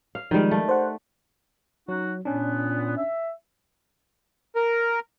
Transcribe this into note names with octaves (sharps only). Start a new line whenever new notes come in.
F5
D#3 F3 G3 G#3
A3
C5 F#5
F#3 C#4 D#4 F#4
A#2 B3 C#4 D4
E5
A#4